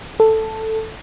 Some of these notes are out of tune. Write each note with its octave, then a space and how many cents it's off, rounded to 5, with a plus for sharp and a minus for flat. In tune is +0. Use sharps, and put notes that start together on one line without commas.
A4 +5